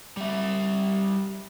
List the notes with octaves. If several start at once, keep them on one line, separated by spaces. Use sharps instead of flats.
G3 E5